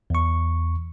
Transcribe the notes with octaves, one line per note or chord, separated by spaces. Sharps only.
E2 C#6